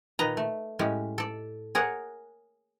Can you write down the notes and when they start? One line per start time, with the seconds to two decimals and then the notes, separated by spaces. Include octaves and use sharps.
0.19 A#2 D#3 B4 D#5 A#5
0.37 A3
0.79 A2 G#3 C#4 G4
1.18 A4 D5
1.75 G#4 A#4 C#5 F#5